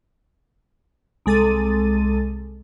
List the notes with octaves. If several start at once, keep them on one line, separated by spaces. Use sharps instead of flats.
C2 G#3 A4 A6 D#7